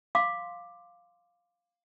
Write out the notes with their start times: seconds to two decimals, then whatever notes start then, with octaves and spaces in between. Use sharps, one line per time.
0.15 F5 C6 D6